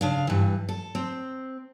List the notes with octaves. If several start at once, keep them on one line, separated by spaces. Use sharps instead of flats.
C#3 D4 F5
G2 E3
A4
C4